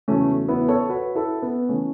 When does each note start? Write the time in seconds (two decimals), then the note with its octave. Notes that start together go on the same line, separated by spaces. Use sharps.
0.08 E2 C#3 F#3 A3 C#4
0.48 B3 E4
0.68 A4 C#5
0.89 F#4 B4
1.15 E4 A4
1.42 B3
1.69 E3 A3 C#4